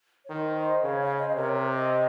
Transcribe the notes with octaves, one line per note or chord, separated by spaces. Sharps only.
C#5
D#3 C5
C5 D#5
C#3 C#5 F5
C#5 F5
C5 D#5
D#5
C3 A#4 C#5
A#4 C#5
C5 D#5